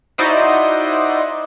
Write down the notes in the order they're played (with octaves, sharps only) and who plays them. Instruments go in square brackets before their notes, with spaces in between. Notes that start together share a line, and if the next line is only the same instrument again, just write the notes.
[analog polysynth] D#4 E4 F#4 C5 D5 D#5